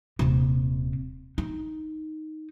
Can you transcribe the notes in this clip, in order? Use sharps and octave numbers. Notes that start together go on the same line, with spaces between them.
D#1 C3
D#4